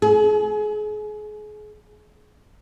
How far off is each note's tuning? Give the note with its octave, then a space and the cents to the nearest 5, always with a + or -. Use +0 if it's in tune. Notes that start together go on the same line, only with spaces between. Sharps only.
G#4 +30